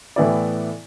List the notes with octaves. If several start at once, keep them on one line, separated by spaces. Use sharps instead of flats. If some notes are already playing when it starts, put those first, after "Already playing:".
A2 E3 B3 E4 D5